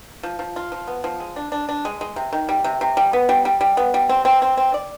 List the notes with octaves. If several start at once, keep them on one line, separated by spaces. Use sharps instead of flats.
F3
F3
F4
F3
B3
F3
G#3
D4
D4
D4
G#3
G#3
C3
D#3
G3
C3
C3
G3
B3
G3
G3
G3
B3
G3
C4
C4
C4
C4
D5